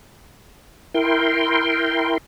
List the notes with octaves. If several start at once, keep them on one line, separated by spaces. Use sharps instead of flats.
E4 A#4 G5 C6